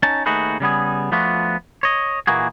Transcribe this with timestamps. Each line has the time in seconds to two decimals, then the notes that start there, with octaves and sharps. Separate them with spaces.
0.03 C#4 D#4 A5
0.26 D#2 A3 D#4 F#4 G#4 B4
0.60 C#3 G3 B3 G#4
1.12 F3 A3 B3 D4 F4 F#4
1.83 C#5 D#5
2.27 A#2 E3 A#3 F#4 G#4